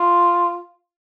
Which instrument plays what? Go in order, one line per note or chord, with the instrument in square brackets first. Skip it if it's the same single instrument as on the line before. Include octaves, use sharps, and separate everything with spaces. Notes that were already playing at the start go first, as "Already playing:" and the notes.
Already playing: [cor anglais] F4